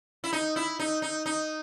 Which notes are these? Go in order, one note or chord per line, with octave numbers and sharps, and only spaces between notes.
E4
D#4
E4
D#4
D#4
D#4